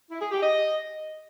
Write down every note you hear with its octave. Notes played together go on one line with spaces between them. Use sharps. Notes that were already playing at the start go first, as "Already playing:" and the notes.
E4
G#4
G4
D#5